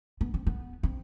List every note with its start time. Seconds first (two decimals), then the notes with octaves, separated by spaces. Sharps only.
0.21 B3
0.34 C4
0.47 B3
0.83 C4